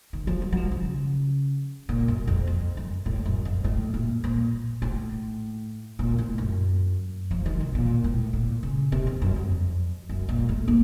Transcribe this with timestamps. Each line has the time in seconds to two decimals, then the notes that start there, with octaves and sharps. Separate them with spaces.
0.13 D#3
0.27 F3
0.42 F#3
0.52 F#3
0.57 F3
0.72 C#3
1.89 A#2
2.08 F#2
2.27 F2
2.47 F2
2.77 F#2
3.06 A2
3.25 F#2
3.45 F2
3.64 A2
3.94 A#2
4.24 A#2
4.82 A2
5.99 A#2
6.18 A2
6.38 F#2
7.31 F3
7.46 D#3
7.60 C3
7.75 A#2
8.04 A2
8.33 A#2
8.63 C#3
8.92 C3
9.07 F2
9.22 F#2
9.36 F2
10.09 F#2
10.29 A#2
10.49 A3
10.68 A#3